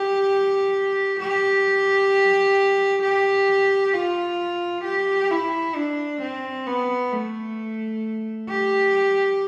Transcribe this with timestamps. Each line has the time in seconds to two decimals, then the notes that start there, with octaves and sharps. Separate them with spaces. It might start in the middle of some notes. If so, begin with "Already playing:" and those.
Already playing: G4
1.20 G4
3.02 G4
3.93 F4
4.85 G4
5.31 E4
5.75 D4
6.22 C4
6.67 B3
7.12 A3
8.49 G4